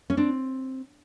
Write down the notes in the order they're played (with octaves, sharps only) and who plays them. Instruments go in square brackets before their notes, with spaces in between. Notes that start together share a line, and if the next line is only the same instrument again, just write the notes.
[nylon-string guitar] C#4
C4 D4